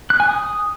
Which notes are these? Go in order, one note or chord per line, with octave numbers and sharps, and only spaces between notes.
F#6
G#5
D#6